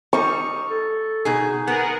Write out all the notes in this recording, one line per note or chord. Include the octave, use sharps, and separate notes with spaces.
G3 D#4 C#6
A4
B2 D#4 G#4
B3 G#4 A#4 F#5